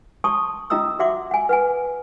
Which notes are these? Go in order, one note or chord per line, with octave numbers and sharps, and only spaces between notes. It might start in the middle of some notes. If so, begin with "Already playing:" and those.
A5 C6 C#6 D#6
C#4 F4 D#5 A#5 D#6 E6
F#4 E5 F#5 C6 D6
F#5 G#5
B4 F#5 G#5